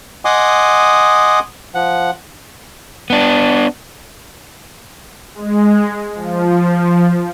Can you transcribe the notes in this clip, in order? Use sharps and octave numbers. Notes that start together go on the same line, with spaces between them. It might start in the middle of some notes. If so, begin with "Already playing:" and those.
D#5 F#5 G#5 C6 D6 D#6
F3 F#5
B3 D4
G#3
F3